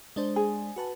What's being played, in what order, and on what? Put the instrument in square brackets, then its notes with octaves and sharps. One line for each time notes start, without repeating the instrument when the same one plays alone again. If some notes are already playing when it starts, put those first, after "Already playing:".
[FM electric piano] G#3 D4 C5
[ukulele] G#4
[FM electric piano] F#4 B4 A5